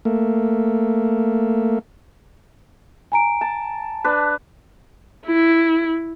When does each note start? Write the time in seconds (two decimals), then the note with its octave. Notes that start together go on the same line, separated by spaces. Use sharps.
0.05 A3 A#3
3.12 G#5 A#5 D7
3.41 A5
4.04 D4 B4
5.27 E4